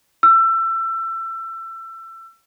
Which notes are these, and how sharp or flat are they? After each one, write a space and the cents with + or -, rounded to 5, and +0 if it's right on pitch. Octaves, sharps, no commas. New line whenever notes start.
E6 +25